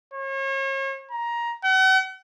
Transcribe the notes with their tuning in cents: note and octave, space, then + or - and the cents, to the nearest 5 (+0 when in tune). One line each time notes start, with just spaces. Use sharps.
C#5 -40
A#5 +15
F#5 +40